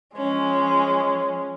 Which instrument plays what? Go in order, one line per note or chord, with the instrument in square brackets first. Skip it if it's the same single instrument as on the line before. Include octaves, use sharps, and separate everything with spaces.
[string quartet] F3 G#3 C#4